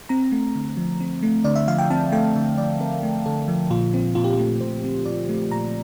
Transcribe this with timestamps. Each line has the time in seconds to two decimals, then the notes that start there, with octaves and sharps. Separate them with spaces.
0.09 C4 A#5
0.32 A3
0.55 D3
0.77 F3
1.00 C4
1.23 A3
1.44 D3 D5
1.55 E5
1.67 F3 F5
1.78 G5
1.90 C4 A5
2.12 A3 G5
2.35 D3 E5
2.57 F3 D5
2.80 C4 A#4
3.03 A3
3.26 D3 A4
3.48 F3
3.70 A#2 F4
3.94 C4
4.15 A#2 F4
4.24 G4
4.33 F4
4.39 A3
4.61 A#2 C5
4.84 C4
5.05 A#2 D5
5.29 A3
5.51 A#2 A#5